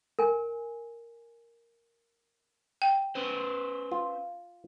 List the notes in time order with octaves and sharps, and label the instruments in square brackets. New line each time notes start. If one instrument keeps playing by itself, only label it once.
[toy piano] A#4 G#5
[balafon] G5
[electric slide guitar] C#4 B4 C5
[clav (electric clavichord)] F4